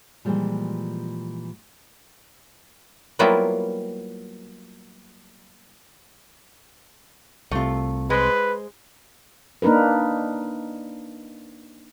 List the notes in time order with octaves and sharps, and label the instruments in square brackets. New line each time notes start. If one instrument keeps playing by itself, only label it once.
[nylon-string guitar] A#2 E3 F3 G3 G#3
[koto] F#3 G3 A#3 B3 E4 F4
[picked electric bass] C2 C3 [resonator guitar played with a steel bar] A3 F4
[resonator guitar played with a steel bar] G#3 C5 [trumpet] B4
[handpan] A#3 D4 D#4 A#4 B4